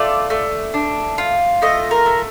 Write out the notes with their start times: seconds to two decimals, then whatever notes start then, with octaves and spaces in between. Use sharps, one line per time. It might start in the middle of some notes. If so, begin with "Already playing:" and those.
Already playing: A3 F4 D5
0.30 A3
0.74 D4
1.18 F4
1.62 A3 D#5
1.91 A#4
2.06 A3